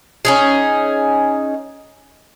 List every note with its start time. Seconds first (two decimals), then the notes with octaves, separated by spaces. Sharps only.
0.25 C#4 D#4 G#4